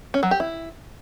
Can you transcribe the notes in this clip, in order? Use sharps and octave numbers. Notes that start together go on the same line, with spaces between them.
C#4
F#3
G4
E4